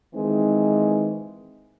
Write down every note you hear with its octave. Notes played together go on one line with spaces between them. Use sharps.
D#3 E3 G#3 C4 D#4